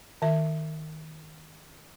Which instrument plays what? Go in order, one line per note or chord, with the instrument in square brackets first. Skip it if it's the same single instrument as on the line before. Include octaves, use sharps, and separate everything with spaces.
[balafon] D#3 E5